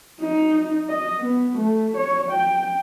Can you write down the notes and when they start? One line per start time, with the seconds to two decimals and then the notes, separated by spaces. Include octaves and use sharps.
0.20 D#4
0.88 D#5
1.19 B3
1.58 A3
1.97 C#5
2.31 G5